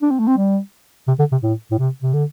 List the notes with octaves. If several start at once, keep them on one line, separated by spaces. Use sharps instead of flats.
D4
C4
A3
C4
G3
C3
D3
C3
A2
A2
C3
C3
D3